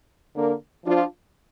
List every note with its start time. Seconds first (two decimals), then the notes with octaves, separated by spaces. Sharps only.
0.35 D3 A#3 D4 A#4
0.86 F3 D4 F4